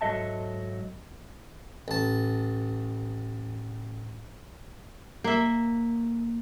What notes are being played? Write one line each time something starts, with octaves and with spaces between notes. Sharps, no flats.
G#2 F#3 A4 D#5 E5 A5
A1 A5
A#3 E5